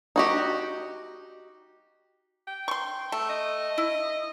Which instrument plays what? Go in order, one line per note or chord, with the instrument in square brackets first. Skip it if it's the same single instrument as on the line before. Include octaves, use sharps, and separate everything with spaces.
[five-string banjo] D#4 F#4 G4
[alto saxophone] G5
[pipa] C6 C#6
A3
[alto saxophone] D#5
[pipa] E4